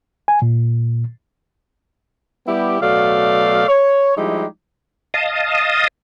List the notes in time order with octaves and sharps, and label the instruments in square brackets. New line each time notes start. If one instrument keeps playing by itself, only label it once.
[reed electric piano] G#5
A#2
[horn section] G3 B3 E4 G4
B2 F#3 A3 D5 F5
C#5
F3 G3 G#3 D#4 E4 G4
[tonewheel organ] D#5 F5 A5 D#6